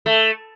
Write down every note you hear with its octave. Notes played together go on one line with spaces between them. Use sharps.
A3